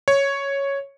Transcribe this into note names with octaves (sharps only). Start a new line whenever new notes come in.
C#5